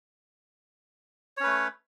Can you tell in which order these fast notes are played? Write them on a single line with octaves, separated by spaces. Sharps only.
C#5 C#4 B4 A3